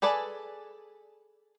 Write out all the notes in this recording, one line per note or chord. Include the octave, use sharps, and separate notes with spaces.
G#4 A4 B4 D5 G#5